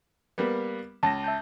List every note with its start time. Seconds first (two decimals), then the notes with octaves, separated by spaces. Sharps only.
0.38 G3 A#3 B3
1.03 C#2 A5 A#6
1.24 E5 A5 G6